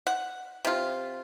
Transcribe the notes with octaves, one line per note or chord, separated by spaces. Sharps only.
F#5
C3 F4